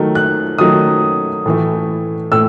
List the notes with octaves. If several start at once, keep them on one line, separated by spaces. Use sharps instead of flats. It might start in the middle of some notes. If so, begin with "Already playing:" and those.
Already playing: D#3 F#3 A3
F#6
D#3 F#3 A3 D#6
A2 E3 A3
A2 E6